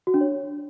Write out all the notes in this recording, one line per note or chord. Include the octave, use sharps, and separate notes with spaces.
F#4
D4
C#5